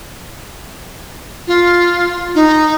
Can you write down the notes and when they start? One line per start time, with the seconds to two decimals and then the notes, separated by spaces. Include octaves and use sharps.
1.47 F4
2.35 D#4